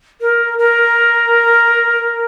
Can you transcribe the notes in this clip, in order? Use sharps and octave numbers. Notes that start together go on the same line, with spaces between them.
A#4
A#4